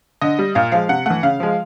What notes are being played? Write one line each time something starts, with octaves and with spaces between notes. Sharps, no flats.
D3 D#5
G3
A#2 F5
F3 G#3 F5
C3 F#5
E3 A3 F#5
C#3 F5
F3 G#3